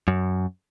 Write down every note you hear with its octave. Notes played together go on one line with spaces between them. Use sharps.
F#2